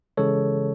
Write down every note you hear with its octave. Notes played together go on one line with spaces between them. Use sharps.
C#3 E3 G#3 A4 C#5